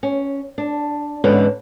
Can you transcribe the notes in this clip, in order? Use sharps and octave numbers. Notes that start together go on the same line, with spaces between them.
C#4
D4
E2 G#2 D3 C#4 B4